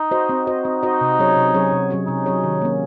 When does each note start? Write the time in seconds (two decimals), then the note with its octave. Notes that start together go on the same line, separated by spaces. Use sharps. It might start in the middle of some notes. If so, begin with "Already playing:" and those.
Already playing: D#4
0.11 F#4 C5 D#5
0.29 C4
0.47 F#4 C5 D#5
0.64 C4 D#4
0.83 F#4 C5 D#5
1.01 C3
1.19 F#3 C#4 G#4 C#5
1.36 C3
1.54 F#3 C#4 G#4 C#5
1.72 C3
1.90 F#3 C#4 G#4 C#5
2.08 C3 D#4
2.26 F#3 C#4 G#4 C#5
2.44 D#3
2.62 A#3 C#4